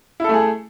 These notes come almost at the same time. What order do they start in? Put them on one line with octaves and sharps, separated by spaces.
E4 A4 A3 G#4